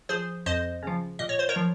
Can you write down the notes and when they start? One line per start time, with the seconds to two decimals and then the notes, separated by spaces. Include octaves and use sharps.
0.09 F3 G#4 C5
0.46 F2 C5 D#5
0.83 C#3 F3
1.19 A#2 D#5
1.29 C#5
1.39 C5
1.49 A#4 C#5
1.56 F3